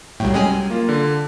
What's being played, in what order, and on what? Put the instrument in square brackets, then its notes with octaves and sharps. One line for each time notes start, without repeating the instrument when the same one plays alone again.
[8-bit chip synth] C2 A2 [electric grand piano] F#3 G3 G5
[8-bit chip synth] G#3 C#4 G#4
[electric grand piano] A#3 F4
D3